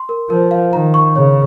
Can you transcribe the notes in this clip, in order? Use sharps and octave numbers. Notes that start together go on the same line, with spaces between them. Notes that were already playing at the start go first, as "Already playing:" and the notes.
Already playing: C6
A#4
F3 A#4
F5
D#3 A#5
C#6
C#3 C#5